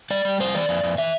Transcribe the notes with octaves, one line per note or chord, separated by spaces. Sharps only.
G3 D5
G3
F2 C5
E3 D5
F2
F2
E3 E5